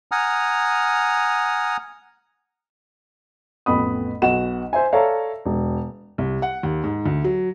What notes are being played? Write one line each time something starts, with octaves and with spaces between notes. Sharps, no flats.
F#5 G#5 A#5 D#6 F6
A1 F2 B3 B5 D#6
B1 B3 F#4 F#5 E7
C5 E5 G#5
A4 C#5 D5 E5 F5 A#5
E1
C2
F#5
D#2
G#2
D2
F#3